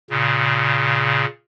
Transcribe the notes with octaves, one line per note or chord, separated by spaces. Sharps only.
A#2 C#3